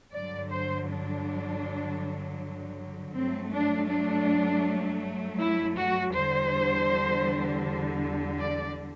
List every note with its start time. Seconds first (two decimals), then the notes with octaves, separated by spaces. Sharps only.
0.13 G2 D3 F#3 D5
0.51 C5
0.89 D4
3.13 G2 F#3 A3 C4
3.51 D4
3.89 D4
5.38 E4
5.76 F#4
6.14 E2 D3 G3 C5
8.39 D5